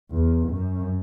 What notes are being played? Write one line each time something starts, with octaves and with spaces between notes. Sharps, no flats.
E2
F#2